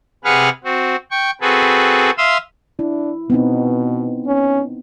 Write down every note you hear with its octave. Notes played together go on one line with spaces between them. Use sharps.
C3 G#4 B4 F5 F#5 F6
C4 F#4
G5 C#6
C4 F#4 G#4 A4 B4
E5 F5 C6 D#6 E6
D4 E4
B2 B3 C4 D#4
C#4